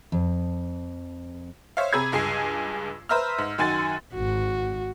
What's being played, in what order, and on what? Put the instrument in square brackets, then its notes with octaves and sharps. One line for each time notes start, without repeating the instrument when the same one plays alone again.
[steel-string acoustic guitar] F2
[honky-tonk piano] C5 C#5 E5 F5
C3 G#4 A#5 B5 E6 G#6
C#2 G2 G#4 G#5 C7
B4 C5 E5 A#5 E6 F6
G#2
F#2 D#3 F#4 G#5 C6 A6
[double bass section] G#1 [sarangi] F#4